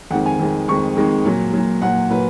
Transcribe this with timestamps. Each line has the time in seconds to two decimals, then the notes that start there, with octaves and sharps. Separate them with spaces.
0.11 F2 D#3 G#3 F#5
0.26 G#5
0.39 F2 D#3 G#3
0.68 F2 D#3 G#3 C#6
0.96 F2 D#3 G#3
1.25 A#2 F#3
1.53 A#2 F#3
1.82 A#2 F#3 F#5
2.10 A#2 F#3 B4